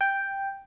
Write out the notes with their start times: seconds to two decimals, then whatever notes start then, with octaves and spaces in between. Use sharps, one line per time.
0.01 G5